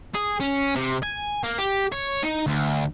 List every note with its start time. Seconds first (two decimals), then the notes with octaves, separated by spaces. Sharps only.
0.15 G#4
0.41 C#4
0.76 C3
1.03 G#5
1.44 A#3
1.59 G4
1.92 C#5
2.23 D#4
2.47 D2